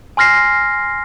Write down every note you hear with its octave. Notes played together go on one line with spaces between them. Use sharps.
G#5 C6 F6 A#6 C7